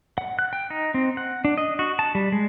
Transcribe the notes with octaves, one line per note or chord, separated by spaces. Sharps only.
F#5
F#6
G5
D#4
C4
F#5
D4
D#5
F#4
A5
G3
G#3